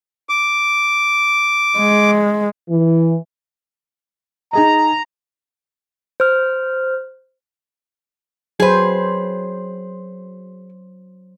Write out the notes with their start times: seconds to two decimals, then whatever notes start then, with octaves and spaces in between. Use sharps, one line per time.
0.29 D6
1.78 G#3
2.69 E3
4.53 D#4 G#4 D#5 A#5
6.20 C5 F6
8.60 F#3 G#4 B4 C5